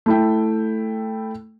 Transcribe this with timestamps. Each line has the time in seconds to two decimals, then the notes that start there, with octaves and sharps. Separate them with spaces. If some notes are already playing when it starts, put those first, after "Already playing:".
0.06 A3 E4 G5